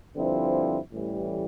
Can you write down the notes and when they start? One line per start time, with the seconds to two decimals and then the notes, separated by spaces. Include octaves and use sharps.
0.15 G2 D3 F3 C4 E4
0.92 A1 A2 E3 G3